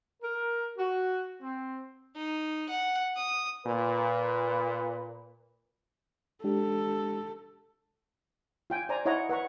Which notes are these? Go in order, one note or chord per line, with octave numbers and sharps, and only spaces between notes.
A#4
F#4
C4
D#4
F#5
D#6
A#2 B4
G#3 D4 G4 A4
F4 G5 G#5
C5 D5 G#5 A#5
E4 C#5 D#5 F#5 A#5 C#6
B4 F#5 A#5 C#6